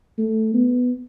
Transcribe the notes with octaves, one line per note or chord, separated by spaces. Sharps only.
A3
B3